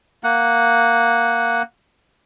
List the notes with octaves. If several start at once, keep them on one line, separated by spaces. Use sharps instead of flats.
A#3 F#5